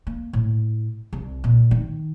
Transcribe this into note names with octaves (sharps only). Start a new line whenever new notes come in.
A#3
A2
C2
A#2
D#3